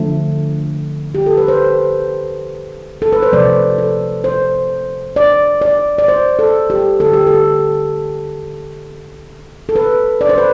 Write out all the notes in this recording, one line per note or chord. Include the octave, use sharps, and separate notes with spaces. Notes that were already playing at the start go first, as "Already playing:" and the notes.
Already playing: D3 F3 A3
G4
A4
B4
C5
A4
B4
C5
C3 F3 A3 D5
A4
C5
D5
D5
D5
C5
A4
G4
D3 A3 A4
G4
A4
A4
B4
D5
C5
B4